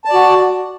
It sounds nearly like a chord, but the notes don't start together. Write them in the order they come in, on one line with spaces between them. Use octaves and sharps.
A5 D5 F#4